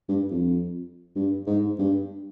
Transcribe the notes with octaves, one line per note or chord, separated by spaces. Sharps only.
G2
F2
G2
G#2
G2